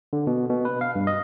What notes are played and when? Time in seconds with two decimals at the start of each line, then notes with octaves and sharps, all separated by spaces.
0.13 D3
0.27 B2
0.49 B2
0.65 B4
0.81 F5
0.95 G2
1.07 D#5